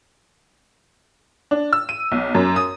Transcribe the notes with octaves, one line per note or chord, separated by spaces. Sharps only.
D4
E6
D#7
B1
F#2
D#6